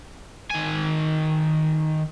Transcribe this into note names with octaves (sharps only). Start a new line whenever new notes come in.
D#3 G#5